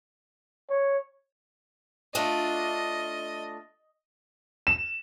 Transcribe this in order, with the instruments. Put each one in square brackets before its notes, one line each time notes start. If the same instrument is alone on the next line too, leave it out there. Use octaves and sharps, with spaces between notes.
[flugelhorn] C#5
[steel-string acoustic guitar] A3 D4 F4 [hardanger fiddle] D#5
[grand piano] E7